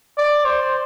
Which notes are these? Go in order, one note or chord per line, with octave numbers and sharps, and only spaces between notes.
D5
C5